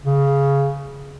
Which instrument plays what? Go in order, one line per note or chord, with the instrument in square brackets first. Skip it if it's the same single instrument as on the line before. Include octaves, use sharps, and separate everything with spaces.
[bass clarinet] C#3